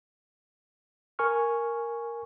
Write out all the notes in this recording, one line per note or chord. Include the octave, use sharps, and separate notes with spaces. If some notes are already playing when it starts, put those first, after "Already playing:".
A#4 G#5 C#6 F6